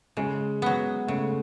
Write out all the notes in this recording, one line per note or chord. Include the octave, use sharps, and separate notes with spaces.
C#3 G#3
F#3 B3
C#3 A3